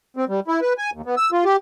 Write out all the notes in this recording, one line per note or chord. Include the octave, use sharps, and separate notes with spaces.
C4
G3
E4
B4
G#5
D#2
B3
E6
F4
G4